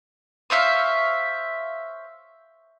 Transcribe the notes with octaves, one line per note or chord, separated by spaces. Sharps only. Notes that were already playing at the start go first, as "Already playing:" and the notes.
C5 C#5 E5 F5